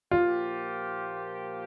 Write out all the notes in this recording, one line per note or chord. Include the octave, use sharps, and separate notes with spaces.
A#2 F3 A#3 F4 G4